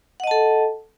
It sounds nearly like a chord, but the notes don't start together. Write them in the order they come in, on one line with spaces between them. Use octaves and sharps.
F#5 D#5 A5 A4